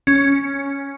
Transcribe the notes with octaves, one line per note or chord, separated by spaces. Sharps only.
C#4